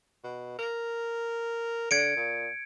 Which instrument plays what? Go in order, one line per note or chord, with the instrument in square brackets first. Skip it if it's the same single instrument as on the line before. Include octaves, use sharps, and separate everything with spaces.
[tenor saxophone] B2
A#4
[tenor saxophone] D3 [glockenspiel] G#6 C#7 D7
[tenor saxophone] A#2